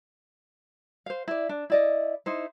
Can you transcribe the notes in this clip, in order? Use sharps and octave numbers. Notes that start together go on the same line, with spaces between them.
C5 F5
E4 D5
D4
E4 D5 D#5
D#4 E4 C5